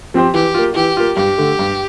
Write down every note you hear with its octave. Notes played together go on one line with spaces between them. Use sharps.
F3 C4 G4 C5
E3 G4
A#3 F4
E3 G4
A#3 F4
G2 G4
D3 A3
G2